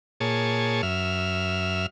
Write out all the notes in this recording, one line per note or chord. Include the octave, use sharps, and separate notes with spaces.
A#2 G#4 C#5 A5
F#2 E5 F6